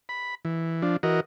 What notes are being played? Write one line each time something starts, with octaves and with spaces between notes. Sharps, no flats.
B5
E3
F3 D4
E3 F#4 A#4 D#5